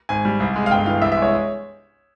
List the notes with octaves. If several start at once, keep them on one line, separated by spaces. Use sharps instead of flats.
G#1 G#5
G3
C2
G#3
F5
G1 G5
E3 F5
C2 E5
E5
G#3 C#5